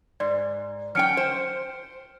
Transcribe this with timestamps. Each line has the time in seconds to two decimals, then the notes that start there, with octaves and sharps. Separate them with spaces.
0.20 G#2 D5
0.95 F#3 C#4 G5 F6 C#7 D7
1.17 C5